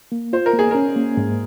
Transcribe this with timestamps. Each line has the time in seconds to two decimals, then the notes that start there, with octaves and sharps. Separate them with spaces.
0.12 A#3
0.33 F4 C5
0.46 A#4
0.53 A#3
0.59 G#4
0.71 C#4 A#4
0.96 A#3
1.17 G#2